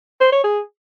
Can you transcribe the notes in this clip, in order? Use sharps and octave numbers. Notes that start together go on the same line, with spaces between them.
C5
C#5
G#4